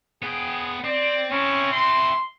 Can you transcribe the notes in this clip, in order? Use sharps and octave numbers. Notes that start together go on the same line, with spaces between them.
B3 G#4 G5
C4 D5
C4 C#4 E4
C6